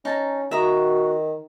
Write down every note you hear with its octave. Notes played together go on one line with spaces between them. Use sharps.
C#4 D#4 A5 A#5
D#3 F#4 E5 A#5 D#6